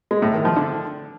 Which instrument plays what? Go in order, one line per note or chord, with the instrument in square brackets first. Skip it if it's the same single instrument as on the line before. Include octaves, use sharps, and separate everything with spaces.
[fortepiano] G#3
A2
D#3
F3
D3